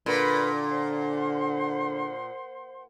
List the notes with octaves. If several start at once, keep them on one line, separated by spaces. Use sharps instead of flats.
A#2 D3 A#4 B4 B5
C5 F#5 C6